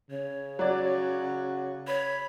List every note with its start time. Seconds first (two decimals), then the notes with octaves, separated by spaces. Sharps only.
0.11 C#3 C#5
0.59 F#3 F#4 D5
1.88 C#5 B5